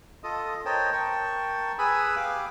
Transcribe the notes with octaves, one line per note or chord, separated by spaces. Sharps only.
F4 A4 D#5 D#6
A#4 C5 C#5 D#5 G5 A5
A#4 G5 A5 C#6
G#4 B4 G#5 B5 D#6 E6
G4 F5 D6